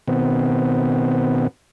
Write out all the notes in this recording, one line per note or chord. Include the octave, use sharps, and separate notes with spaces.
B2 D#3 B3 C4